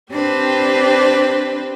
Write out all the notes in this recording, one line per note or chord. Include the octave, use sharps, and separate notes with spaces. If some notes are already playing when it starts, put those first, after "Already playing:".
C4 D4 G4 B4 C5